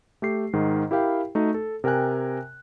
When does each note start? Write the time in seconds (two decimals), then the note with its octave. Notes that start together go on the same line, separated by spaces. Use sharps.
0.22 A3 G4 C7
0.53 G#2 D#3
0.91 E4 G4 A#4 F5 G5 B5
1.35 A3 D#4 F#4
1.54 A4
1.84 C3 A#4 G5 G#5 F#6